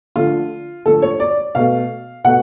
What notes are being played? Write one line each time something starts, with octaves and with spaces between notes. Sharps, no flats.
D3 F3 A3 F4
D3 F3 A3 A4
C#5
D5
B2 A3 F5
B2 A3 F#5